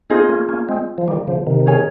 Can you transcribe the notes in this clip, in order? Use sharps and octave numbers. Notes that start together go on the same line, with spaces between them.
C4 D#4 F4 G#4 D#5
A#3 C#4
A#3 C#4
G#3 C4
F3
D#3 G3
C#3 F3
C3 D#3
C#4 G#4 C#5 G#5